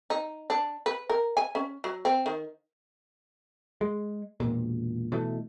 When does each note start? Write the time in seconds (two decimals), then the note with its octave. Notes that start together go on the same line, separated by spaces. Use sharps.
0.10 D#4
0.50 D4
0.86 B4
1.10 A#4
1.37 G#5
1.55 C#4
1.84 F#3
2.05 C4
2.26 D#3
3.81 G#3
4.40 E1 A#2
5.12 B2 E3 A3